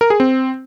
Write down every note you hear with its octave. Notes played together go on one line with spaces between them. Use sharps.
A#4
G#4
C4